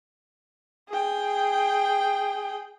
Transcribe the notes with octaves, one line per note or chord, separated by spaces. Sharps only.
G#4 G5